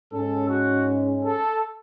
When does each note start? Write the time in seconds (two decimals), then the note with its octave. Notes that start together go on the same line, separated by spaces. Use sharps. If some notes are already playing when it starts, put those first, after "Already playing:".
0.13 G#2 G#3 C#4 A4
0.50 F#4
1.24 A4